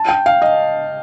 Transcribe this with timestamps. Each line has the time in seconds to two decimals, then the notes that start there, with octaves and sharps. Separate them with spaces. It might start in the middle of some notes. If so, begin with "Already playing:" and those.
Already playing: A5
0.09 G5
0.26 F5
0.42 D#5